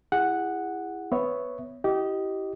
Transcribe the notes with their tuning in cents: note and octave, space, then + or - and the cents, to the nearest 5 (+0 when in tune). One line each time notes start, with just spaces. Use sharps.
E4 +15 G#4 -30 F#5 +0
B3 +5 C#5 +0 E5 +0
E4 +0 G4 -20 D#5 +0